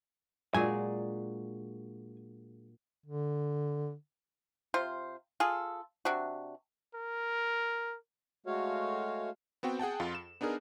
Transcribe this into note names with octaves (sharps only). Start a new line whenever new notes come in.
A#2 F#3 G#3 D4 G#4 G#5
D3
C3 F4 C5
F4 G#4 A4
C3 D4 F#4
A#4
G#3 A3 F#4 C#5 F5
B3 C4 F#4 G5
G#4 F#5 G5 A5
F2 F4
E7
B3 D4 D#4 G#4 A#4